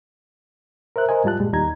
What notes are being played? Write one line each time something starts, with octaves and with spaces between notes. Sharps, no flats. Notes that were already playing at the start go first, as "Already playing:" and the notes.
A#4 C5 E5 F#6
A#4 C5 D#5 G#5
G#2 G3 F4 A5 F#6
G2 A#2 G3 G#3
D#2 G3 D#4 A#5 G#6